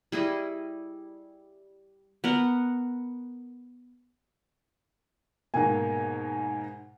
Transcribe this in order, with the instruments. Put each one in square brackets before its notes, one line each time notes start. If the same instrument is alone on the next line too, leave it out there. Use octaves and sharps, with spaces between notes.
[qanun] G3 E4 G#4 D#5
B3 A#4 F#5
[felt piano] G#2 B2 A#3 [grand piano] G#5